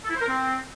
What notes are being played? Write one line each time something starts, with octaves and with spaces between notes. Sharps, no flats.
A4
E4
C5
A#4
C4